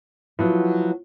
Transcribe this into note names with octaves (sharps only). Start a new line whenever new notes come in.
F3 F#3 B3 E4